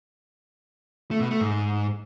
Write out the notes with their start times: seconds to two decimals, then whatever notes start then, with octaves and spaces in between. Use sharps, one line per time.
1.11 A3
1.21 B2
1.31 A3
1.40 G#2